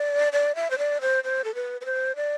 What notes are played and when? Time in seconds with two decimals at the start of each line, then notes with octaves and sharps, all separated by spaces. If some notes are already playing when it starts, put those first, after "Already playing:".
Already playing: D5
0.33 D5
0.55 E5
0.71 C5
0.78 D5
1.01 C5
1.24 C5
1.44 A4
1.55 B4
1.81 B4
1.85 C5
2.16 D5